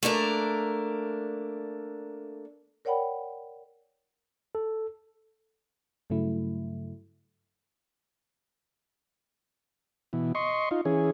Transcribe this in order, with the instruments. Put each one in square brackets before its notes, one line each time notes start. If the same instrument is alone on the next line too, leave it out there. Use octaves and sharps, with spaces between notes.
[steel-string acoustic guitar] A3 A#3 D4 A#4
[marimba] A#4 C#5 D5 F#5 G5 B5
[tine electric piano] A4
[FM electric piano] G2 C#3 F#3 A3 E4
[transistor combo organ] B2 E3
D#5 C6 C#6
D#4 F4
E3 C#4 G#4